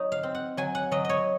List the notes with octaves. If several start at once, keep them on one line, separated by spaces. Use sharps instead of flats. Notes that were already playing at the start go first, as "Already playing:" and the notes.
Already playing: F#3 D#4 C#5
F5
C4
F#5
F#3 G#5
F#5
F#3 D#5
C#5 D#5